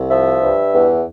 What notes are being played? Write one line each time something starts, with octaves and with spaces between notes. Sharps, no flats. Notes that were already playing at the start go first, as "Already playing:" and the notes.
Already playing: C2
F3 E5
G2
E2